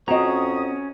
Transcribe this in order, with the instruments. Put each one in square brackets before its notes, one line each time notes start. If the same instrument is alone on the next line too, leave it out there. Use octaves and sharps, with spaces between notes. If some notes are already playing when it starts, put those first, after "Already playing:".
[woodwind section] F2 C#6 D#6 [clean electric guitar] C4 A#5 [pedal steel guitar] C#4 [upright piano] F#4 D#5